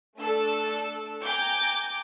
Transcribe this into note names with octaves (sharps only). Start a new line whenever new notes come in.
A3 D4 A4 E6
G5 G#5 A#5 D6 G6